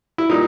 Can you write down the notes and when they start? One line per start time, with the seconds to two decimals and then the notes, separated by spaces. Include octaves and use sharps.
0.18 E4
0.30 A#2 G3 D#4